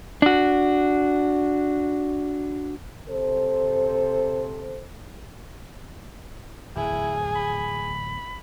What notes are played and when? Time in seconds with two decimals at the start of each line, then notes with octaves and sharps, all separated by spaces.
0.22 D4 F#4
3.08 C3 A4 C5
6.76 D1 E2 E4 G#4
7.36 B5